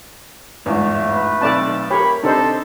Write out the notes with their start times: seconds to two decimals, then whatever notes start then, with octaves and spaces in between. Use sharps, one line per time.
0.66 G1 E2 G#2 A3
1.09 B4
1.41 B1 C4 A4 D5 A5
1.90 G4 A#4 C#5 B5
2.23 C3 D4 D#4 A4 C5